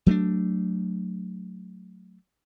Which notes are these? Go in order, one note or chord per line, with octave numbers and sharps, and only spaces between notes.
F#3 A3 A#3 D4